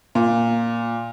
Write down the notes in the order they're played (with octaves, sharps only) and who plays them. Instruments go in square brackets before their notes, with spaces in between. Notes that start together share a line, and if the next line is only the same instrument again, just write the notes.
[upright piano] A#2